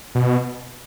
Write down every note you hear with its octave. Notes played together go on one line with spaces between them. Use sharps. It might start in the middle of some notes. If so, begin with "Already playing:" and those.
B2